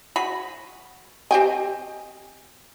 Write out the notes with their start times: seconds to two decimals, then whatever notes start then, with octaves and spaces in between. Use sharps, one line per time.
0.16 F#4 G#4 B5
1.31 C4 G4 D#5 G5 G#5